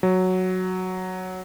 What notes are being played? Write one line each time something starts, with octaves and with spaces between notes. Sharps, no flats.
F#3